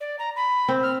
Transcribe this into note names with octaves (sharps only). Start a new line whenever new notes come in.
D5
A#5
B5
C4
F6